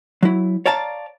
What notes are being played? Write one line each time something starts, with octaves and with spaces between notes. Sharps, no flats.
F#3 E4
C#5 D5 F5 A5 A#5